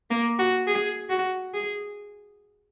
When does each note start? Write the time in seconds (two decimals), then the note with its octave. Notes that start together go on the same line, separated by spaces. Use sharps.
0.10 A#3
0.39 F#4
0.67 G#4
1.10 F#4
1.54 G#4